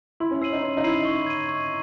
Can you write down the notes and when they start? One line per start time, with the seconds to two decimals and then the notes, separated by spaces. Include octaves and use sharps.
0.20 E4 C6
0.31 C#4
0.41 C#4 E6 C7 D#7 F#7
0.53 D#4
0.63 C#4 C6
0.77 D#4
0.84 E4 E6 C7 D#7 F#7
1.05 C#6
1.26 G#6 D#7
1.48 C#6